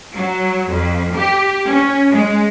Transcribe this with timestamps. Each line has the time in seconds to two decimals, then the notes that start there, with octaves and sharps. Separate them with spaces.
0.15 F#3
0.70 F2
1.15 G4
1.69 C#4
2.12 G#3